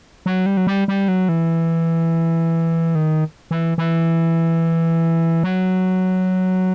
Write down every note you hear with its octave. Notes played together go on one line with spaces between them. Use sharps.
F#3
G3
F#3
G3
G3
F#3
E3
D#3
E3
E3
F#3